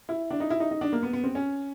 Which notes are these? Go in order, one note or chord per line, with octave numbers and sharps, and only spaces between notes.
E4
D4
D#4
E4
D#4
D#4
D4
A#3
B3
B3
C4
C#4